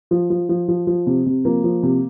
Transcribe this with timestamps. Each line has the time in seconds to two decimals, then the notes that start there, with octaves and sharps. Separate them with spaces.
0.11 F3
0.30 F3
0.49 F3
0.68 F3
0.87 F3
1.07 C3
1.26 C3
1.45 F3 A#3
1.64 F3
1.83 C3